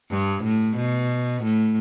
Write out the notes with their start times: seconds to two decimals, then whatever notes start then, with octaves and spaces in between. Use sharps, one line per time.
0.10 G2
0.43 A2
0.77 B2
1.44 A2